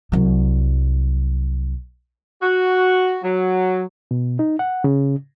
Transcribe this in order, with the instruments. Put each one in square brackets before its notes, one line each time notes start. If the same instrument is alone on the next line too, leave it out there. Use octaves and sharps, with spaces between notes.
[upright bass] C2 F#3
[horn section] F#4
F#3
[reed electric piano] B2
D#4
F#5
C#3